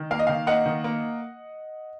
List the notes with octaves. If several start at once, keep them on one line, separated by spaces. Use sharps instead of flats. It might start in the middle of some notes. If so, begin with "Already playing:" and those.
Already playing: D#3
A#3 F5
D#5
D#3 F5
A#3 D#5 F#5
D#3
A#3